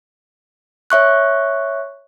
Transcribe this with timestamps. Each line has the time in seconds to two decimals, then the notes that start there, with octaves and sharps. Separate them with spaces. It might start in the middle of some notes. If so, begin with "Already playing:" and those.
0.90 C#5 E5 C#6 F#6